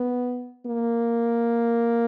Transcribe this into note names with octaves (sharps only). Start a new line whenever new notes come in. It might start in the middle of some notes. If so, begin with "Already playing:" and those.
Already playing: B3
A#3